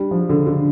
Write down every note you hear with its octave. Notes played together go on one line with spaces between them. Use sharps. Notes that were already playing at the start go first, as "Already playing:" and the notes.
Already playing: G3 D4
F3
D3
D3